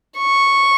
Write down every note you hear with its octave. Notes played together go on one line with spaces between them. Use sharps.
C#6